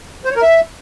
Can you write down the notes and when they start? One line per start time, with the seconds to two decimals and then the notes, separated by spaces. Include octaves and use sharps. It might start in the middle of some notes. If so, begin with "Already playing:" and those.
0.25 C5
0.31 C#5
0.36 A#4
0.42 E5